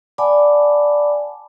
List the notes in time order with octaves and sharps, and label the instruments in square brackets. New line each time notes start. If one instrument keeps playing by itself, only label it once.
[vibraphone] D5 F#5 G#5 A5 B5 D6